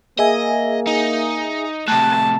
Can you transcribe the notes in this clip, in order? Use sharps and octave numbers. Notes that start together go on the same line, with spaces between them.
A#3 G#4 D#5 E5 G#5
D#4
A2 C3 A5 F#6